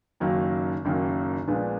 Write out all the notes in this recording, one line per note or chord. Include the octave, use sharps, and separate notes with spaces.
F#1 F#2 D#3 F#3 A#3
F#1 F#2 D#3 F#3 A#3
A#1 A#2 G#3 B3 D4